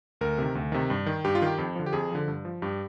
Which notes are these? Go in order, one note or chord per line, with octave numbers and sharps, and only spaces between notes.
D2 A#4
C3 D#3
D2
C3 D#3
G2
D#3
G2 G4
F4
D#3 G4
F2
D3 F3
G4
F2 G#4
D3 F3
G2
F3
G2 G4